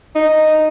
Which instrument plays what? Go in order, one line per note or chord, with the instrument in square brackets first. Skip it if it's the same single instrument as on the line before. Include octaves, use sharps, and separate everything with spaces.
[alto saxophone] D#4